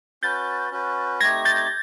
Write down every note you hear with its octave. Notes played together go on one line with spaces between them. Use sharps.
C#4 F#4 B4 G6 A6
C#4 F#4 B4
A3 C4 D#4 G4 G#6 A#6
G6 A6